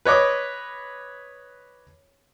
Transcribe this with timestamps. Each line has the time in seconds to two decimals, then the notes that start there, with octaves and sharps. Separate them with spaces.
0.05 B4 C#5 D#5 D6